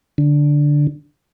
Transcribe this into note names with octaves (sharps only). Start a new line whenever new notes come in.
D3